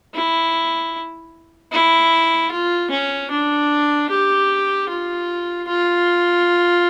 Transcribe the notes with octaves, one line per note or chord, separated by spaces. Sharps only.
E4
E4
F4
C#4
D4
G4
F4
F4